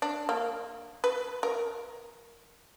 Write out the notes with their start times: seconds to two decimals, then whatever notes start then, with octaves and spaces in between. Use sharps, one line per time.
0.02 D4
0.29 A#3
1.04 B4
1.43 A#4